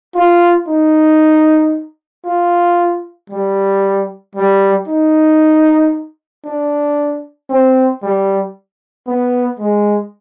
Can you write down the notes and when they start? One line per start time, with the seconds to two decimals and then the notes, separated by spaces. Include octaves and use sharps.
0.15 F4
0.68 D#4
2.25 F4
3.30 G3
4.35 G3
4.88 D#4
6.45 D4
7.50 C4
8.02 G3
9.07 B3
9.59 G#3